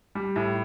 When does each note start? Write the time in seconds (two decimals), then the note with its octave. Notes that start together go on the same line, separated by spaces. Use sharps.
0.15 G3
0.36 A2